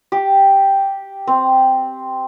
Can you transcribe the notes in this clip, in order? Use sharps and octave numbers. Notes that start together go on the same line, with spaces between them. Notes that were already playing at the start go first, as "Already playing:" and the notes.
G4
C4